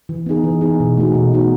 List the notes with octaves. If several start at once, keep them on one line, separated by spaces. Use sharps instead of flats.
E3
B3 D#4 G#4
E3
B3 D#4 G#4
B2
A3 D#4 F#4
B2
A3 D#4 F#4